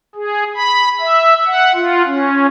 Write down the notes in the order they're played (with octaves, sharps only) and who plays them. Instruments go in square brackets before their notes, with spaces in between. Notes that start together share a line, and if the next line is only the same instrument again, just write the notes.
[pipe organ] G#4
B5
E5
F#5
F4
C#4